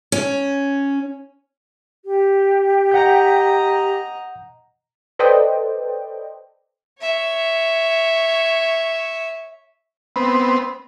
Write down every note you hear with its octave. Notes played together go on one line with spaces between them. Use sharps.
C#4
G4
D#5 F#5 A#5 G6
A4 B4 C5 D5 D#5 G5
C#5 E5
B3 C4